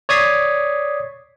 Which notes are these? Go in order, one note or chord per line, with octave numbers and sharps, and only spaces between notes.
C#5 D5 D#6 G#6 B6 C7